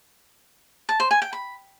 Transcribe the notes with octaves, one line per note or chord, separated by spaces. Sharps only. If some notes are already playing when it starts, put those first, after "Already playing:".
A5
C5
G#5
G5
B5